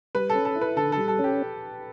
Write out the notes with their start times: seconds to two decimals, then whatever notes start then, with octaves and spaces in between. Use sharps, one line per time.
0.15 G3 B4
0.30 A4
0.35 C#4
0.45 A4
0.55 E4
0.61 B4
0.77 D3 A4
0.92 A4
0.97 G3
1.08 A4
1.19 C#4 G4